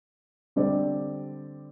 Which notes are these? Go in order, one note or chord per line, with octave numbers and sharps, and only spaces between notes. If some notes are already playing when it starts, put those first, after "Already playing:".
D3 G3 C4 G4 D5